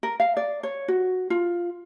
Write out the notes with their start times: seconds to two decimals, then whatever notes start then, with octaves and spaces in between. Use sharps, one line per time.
0.03 A#4
0.20 F5
0.37 D5
0.63 C#5
0.88 F#4
1.30 F4